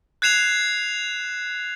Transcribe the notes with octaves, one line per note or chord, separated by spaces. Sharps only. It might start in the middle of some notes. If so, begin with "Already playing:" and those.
F#6 G#6 C7 E7 F7